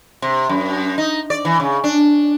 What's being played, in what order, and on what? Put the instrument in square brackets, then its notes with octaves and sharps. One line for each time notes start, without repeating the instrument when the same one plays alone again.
[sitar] C3
F#2
D#4
D5
E3
C#3
D4